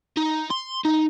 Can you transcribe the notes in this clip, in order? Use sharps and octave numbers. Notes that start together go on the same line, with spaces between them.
D#4
C6
D#4